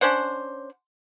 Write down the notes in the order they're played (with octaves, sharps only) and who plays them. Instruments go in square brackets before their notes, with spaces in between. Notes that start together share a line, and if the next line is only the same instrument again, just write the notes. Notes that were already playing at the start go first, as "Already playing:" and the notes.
[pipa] C#4 D4 C5 F#5